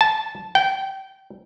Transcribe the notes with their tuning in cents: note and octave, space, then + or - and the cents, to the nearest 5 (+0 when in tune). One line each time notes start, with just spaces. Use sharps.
A5 -10
G5 -20